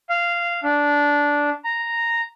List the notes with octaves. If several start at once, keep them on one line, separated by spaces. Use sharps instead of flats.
F5
D4
A#5